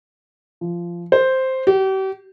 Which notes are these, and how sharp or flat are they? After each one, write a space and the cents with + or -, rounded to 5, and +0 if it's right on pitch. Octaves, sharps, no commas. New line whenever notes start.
F3 -15
C5 +0
G4 -40